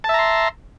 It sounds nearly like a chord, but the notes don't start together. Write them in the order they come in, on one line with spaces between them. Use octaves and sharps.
A5 E5 A#5 C6